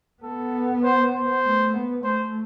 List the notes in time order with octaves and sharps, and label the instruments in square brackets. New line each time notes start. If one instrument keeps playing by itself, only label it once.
[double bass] B3 [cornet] A4
[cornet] C5
C5
[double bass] A3
B3
[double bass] A3 [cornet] C5